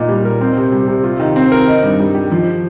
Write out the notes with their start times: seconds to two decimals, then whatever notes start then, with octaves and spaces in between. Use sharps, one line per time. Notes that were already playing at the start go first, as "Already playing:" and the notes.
Already playing: A#2 D#4
0.09 G3
0.25 A#4
0.41 C4
0.57 C3
0.72 G3
0.88 C3
1.04 F4
1.20 D#3
1.36 C4
1.52 A#4
1.68 D#4
1.83 G2
2.00 G3
2.15 G4
2.31 F3